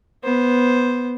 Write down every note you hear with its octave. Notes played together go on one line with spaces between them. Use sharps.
B3 C5